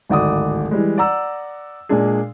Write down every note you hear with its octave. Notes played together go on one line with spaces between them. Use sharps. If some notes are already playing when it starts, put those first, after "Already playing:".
D1 G#1 F#4 D5 D6 D#6
E3 G3 G#3
D5 F#5 A#5 E6
A#2 G#3 D4 G#4